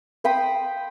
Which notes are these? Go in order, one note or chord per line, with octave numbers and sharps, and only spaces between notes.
C5 G5 B5 D#6